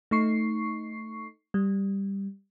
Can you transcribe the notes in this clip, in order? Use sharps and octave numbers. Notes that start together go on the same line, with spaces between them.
A3 D#4 C#6 C7
G3